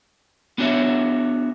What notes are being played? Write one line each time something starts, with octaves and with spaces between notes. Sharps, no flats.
B3 D4 F#4 C#5 E5